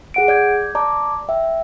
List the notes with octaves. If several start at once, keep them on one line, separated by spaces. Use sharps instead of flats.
G#4 F#5 D7
D5 G6 G#6
D5 A5 A#5 D6
E5 G5